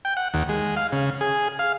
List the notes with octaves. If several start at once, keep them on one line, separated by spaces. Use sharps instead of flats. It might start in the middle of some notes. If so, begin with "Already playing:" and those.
G5
F#5
D#2
G#3
F5
C#3
G#4
F5